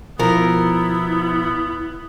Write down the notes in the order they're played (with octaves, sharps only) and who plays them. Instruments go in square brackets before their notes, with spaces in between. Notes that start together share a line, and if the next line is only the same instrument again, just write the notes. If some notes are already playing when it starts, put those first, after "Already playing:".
[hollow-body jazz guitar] B2 F3 [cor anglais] B3 [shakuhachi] E4 [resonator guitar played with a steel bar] A#4